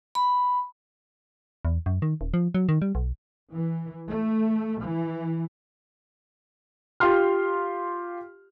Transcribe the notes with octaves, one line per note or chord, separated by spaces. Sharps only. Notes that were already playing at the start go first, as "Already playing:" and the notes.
B5
E2
F#2
D#3
D#1
F3
F#3
D#3
G3
B1
E3
A3
E3
F4 G4 C6 F6